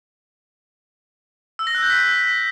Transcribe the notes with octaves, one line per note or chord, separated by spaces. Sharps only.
E6
A#6
F#6
G6
B6